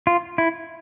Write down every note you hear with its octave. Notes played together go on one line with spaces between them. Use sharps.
F4
E4